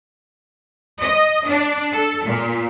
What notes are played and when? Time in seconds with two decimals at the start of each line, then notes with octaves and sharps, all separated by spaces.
1.00 D#5
1.46 D4
1.93 A4
2.25 A#2